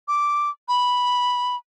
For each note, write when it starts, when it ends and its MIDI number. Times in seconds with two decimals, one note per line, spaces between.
0.08 0.50 86
0.68 1.56 83